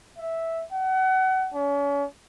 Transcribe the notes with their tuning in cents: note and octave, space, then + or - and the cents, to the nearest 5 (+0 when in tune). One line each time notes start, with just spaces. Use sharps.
E5 -5
F#5 +30
C#4 +35